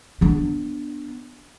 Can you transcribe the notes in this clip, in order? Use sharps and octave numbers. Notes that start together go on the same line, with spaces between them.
B3 D4